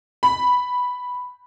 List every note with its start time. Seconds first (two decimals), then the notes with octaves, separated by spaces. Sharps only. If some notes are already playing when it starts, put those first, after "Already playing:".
0.23 B5